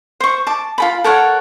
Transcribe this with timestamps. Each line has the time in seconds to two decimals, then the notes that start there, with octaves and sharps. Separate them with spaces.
0.20 C5 C#6
0.47 A5 D6
0.78 F4 A4 B5
1.04 A4 A#4 C#5 F#5